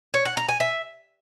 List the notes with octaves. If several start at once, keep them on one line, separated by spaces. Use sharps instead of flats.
C#5
F#5
A#5
G#5
E5